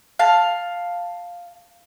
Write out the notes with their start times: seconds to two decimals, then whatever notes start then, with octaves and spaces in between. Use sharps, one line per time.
0.19 F5 A5